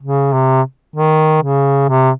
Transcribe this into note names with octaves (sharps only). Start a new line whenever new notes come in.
C#3
C3
D#3
C#3
C3